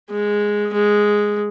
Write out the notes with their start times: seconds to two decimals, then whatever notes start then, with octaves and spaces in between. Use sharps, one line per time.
0.10 G#3
0.73 G#3